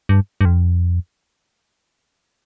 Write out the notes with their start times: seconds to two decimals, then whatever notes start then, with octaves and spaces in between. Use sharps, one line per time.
0.09 G2
0.41 G2
0.45 F2